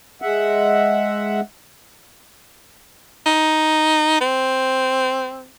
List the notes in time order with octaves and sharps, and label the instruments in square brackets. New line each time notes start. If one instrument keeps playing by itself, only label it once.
[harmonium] G#3 E5 F#5
[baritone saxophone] D#4
C4